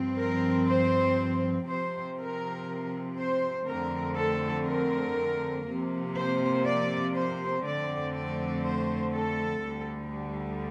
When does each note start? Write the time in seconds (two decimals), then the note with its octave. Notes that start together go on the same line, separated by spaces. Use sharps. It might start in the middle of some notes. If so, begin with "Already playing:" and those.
Already playing: G2 F3 C4
0.18 A#4
0.68 C5
1.67 C3 F3 C4 C5
2.18 A#4
3.17 C5
3.66 F2 D3 A3 C4 A#4
4.16 A4
4.66 A#4
5.66 C3 F3 A#3
6.16 C5
6.65 D5
7.14 C5
7.64 F2 D3 A3 C4 D5
8.14 D5
8.64 C5
9.14 A4
9.64 D2 D3 G3